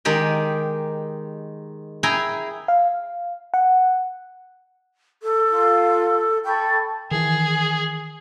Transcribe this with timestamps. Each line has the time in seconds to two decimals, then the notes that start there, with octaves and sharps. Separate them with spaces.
0.05 D#3 G#3 G4 D#5
2.03 E4 G#4 G5 G#5 A#5
2.68 F5
3.54 F#5
5.23 A4
5.49 F4
6.45 A4 G5 B5 C#6
7.11 D#3 E3 G#4